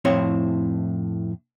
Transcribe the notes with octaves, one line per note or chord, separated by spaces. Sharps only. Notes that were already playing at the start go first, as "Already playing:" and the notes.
F2 A2 C4 E4 C#5 C6